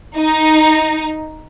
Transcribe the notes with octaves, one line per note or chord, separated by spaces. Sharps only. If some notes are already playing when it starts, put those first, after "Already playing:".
D#4